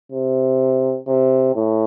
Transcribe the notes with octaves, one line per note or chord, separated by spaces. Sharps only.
C3
C3
A2